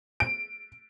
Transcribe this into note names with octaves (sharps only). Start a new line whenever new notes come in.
D7